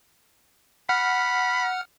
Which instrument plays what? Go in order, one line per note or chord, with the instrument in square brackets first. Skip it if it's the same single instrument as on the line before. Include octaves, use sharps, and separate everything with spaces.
[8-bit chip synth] F#5 F6 [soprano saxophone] B5